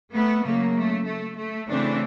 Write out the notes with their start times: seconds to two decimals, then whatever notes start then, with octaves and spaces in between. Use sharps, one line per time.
0.14 A3 B3
0.44 C#3 F#3 A3 A#3
0.76 A3
1.06 A3
1.38 A3
1.69 C#3 E3 A3 C4 D4